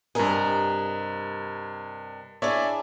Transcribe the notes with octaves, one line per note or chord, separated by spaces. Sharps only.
G2 C3 A#4 D#5 G#5
D4 E4 G#4 C#5 D5 E5